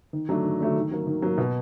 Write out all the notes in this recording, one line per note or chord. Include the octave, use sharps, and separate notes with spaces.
D#3
F#3 A3 D4
D#3
F#3 A3 D4
D#3
F#3 A#3
D#3
F#3 A#3
B2